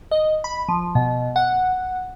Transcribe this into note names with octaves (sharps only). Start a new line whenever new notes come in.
D#5
B5
F3
B2
F#5